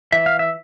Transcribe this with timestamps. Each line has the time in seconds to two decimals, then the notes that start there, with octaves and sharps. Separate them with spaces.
0.12 E3 E5
0.26 F5
0.39 E5